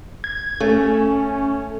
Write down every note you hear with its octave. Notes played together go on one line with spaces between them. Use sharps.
G#6
A3 C#4